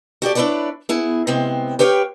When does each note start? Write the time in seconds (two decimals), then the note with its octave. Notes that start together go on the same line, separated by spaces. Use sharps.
0.22 F#4 G4 A4 D5
0.35 D4 E4 G4 B4 C#5 D5
0.89 B3 E4 G#4
1.27 C3 G#3 B3 C4
1.79 G4 B4 C#5 F5 G5